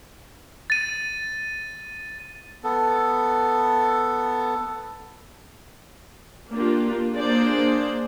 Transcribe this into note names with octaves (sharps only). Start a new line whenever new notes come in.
A6 D#7
B3 A4
A#3 D4 F4 G4
A#3 D4 G#4 C5 D5